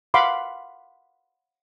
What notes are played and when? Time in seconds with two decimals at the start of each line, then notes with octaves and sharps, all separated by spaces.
0.14 F5 F#5 B5 C6 D6